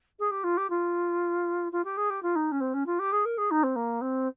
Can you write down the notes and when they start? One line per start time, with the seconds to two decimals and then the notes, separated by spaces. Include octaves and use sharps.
0.19 G#4
0.31 G4
0.44 F4
0.57 G4
0.70 F4
1.72 F4
1.84 G4
1.97 G#4
2.10 G4
2.23 F4
2.36 D#4
2.52 C#4
2.61 C4
2.74 C#4
2.86 F4
2.99 G4
3.12 G#4
3.25 A#4
3.38 G#4
3.51 D#4
3.63 C4
3.76 A#3
4.01 C4